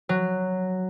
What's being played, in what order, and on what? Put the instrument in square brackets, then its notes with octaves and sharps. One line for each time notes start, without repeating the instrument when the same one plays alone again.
[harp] F#3